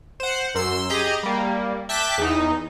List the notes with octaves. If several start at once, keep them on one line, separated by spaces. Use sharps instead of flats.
C5 F#5
F#2 C6 E6
G4 G#4 D#5 A#5
G3 A#3
E5 G5 A5 D6 F#6 B6
E2 D#4